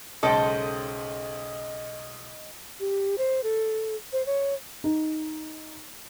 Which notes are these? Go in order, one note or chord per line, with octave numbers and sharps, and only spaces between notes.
B1 C#3 G#3 A4 C5 D#5 G5
G4
C5
A4
C5
C#5
D#4